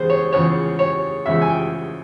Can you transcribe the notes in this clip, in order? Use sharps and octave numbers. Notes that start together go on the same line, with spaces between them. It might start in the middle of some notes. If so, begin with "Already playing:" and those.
Already playing: E2 C#3 G#4 C5
C#5
E2 C#3 F3 C#5
C#5
E2 C#3 F3 E5
G#5
G5